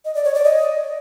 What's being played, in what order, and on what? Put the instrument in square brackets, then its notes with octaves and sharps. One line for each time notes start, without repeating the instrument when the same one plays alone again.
[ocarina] D#5
D5
C#5
D5
D#5